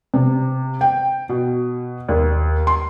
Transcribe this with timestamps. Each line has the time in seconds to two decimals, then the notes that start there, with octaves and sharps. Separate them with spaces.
0.14 C3
0.81 G5
1.29 B2
2.09 D#2
2.67 C6